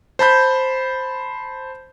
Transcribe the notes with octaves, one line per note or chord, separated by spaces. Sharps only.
C5 A5 B5 G6